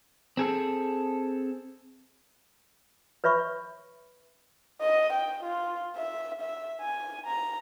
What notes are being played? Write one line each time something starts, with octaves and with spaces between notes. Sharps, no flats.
C4 G#4 A4
B4 C#5 E5 B5 C#6
D#5
G5
F4
E5
E5
G#5
A#5